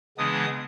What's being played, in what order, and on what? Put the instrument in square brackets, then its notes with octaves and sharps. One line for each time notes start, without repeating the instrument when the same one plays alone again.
[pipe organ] C#3 E3 G#3 B3 D4 D#6